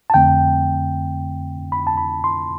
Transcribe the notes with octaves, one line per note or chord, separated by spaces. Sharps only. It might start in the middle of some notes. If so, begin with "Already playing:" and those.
A5
F2 D3 A3 C4 G5
B5
A5
B5
C6